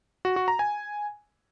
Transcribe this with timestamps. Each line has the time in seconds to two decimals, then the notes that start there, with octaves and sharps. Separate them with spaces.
0.25 F#4
0.36 F#4
0.48 A#5
0.59 G#5